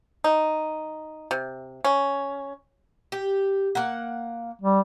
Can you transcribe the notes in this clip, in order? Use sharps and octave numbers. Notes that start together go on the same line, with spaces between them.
D#4
C3
C#4
G4
A#3 F#5
G3